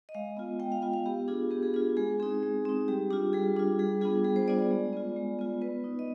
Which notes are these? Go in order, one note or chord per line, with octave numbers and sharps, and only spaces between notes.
D#5
G#3 F5
B3 F4
G#3 G5
F5
B3 F4 F5
F5
B3 G4
D4 F4 G#4
B3 G4
G#4
D4 F4 G#4
G#3 G#4
C4 D#4 G#4
G#3
C4 D#4
G3 G4
D4 F4 G4
G3 G#4
D4 F4
G3 G#4
B3 D4 F4 G#4
G3 G#4
C5
B3 D4 F4 D5
D5
G#3
B3 F4
G#3
B3 F4
B3 B4
D#4
D#5